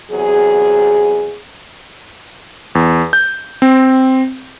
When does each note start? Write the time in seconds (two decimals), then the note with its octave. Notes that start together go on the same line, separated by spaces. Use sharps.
0.12 E2 C3 F#3 G#4
2.75 E2
3.13 G6
3.62 C4